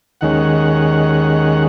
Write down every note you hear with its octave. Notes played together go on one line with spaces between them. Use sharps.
D#2 D#3 G#3 C#4 F#5